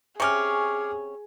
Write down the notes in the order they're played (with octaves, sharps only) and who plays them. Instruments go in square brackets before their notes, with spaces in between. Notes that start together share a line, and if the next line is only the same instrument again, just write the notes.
[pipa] C3 C#4 [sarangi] G#4 [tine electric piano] C#6 D6 F6